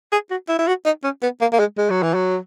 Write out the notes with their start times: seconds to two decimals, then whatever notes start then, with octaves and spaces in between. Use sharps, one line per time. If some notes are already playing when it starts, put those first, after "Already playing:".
0.12 G#4
0.31 F#4
0.49 E4
0.59 E4
0.68 F#4
0.86 D#4
1.04 C#4
1.23 B3
1.41 A#3
1.53 A#3
1.59 G#3
1.78 G#3
1.90 F#3
2.03 E3
2.15 F#3